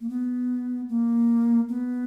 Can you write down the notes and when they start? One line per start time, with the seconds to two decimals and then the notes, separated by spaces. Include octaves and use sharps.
0.01 A#3
0.09 B3
0.89 A#3
1.69 B3